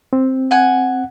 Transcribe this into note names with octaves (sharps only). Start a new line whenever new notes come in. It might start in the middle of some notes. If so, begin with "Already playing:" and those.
C4
F#5 G#5